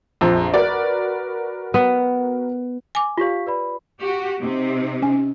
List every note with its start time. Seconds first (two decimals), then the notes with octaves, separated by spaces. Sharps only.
0.21 A#1 F2 C5 A#5
0.54 F#4 A#4 B4 D5
1.74 B3
2.95 G#5 D6
3.17 F4 G4 C#5 F5 C#6 B6
3.47 B4 D5 B5
4.00 F#4 G4
4.39 C3 C4 D#4
5.02 C#4 G#5